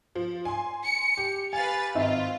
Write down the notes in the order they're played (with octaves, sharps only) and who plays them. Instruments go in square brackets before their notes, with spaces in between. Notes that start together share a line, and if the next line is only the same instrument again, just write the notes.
[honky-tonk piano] F3
G#5 C6
[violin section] C#7
[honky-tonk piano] G4
[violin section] B4 F5 A6 [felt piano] G#5
[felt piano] G#1 D#4 E5 [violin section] C4 F4